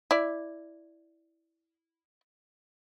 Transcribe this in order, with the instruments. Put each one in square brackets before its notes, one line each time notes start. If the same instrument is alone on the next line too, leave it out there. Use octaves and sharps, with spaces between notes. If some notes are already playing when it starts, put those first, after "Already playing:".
[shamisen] E4 D5